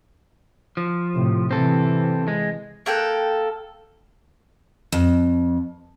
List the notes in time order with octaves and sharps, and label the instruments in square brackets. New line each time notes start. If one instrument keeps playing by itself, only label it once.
[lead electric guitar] F3
[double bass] A2 C3
[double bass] C3 E3 [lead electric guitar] C4 A4
[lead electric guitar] G#3
[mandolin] A#3 A4 G5 F#6
[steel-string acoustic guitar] F2